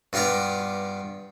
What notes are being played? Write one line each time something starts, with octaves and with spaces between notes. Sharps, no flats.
G2 B3 F4 G4 A#5